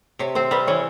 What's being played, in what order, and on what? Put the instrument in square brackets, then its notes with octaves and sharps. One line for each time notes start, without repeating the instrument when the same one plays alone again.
[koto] C3 [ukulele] C#5
[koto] C4 [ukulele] C5
[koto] G3 [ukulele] B4
[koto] E3 [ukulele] C#5